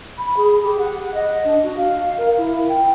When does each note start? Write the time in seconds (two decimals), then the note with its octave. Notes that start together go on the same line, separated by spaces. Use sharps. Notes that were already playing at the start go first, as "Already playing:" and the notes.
0.18 B5
0.37 G#4
0.63 G4
0.78 F#5
1.14 D#5
1.44 D4
1.63 F#4
1.77 F5
2.18 A#4
2.37 E4
2.69 G5